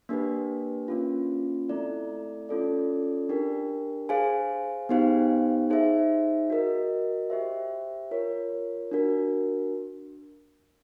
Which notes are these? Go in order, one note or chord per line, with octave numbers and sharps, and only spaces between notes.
A#3 D4 G4 B4
A#3 C#4 F4
A3 C4 E4 A4 D5
C#4 F4 A4 D5
D4 G4 A#4
G#4 C5 F5 G#5
B3 D#4 G4 C5 F5
D#4 G#4 C5 E5
F#4 A#4 D#5
G4 C5 E5
F4 A#4 C#5
D4 F#4 A#4